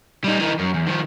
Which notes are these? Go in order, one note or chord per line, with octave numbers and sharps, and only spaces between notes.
G3 D#4
E3 D#4
F#2
E2
D#3 F3